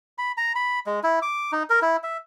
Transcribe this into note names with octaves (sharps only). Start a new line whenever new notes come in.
B5
A#5
B5
G#3
E4
D6
D#4
A#4
E4
E5